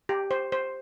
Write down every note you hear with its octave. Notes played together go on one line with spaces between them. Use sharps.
G4
C5
C5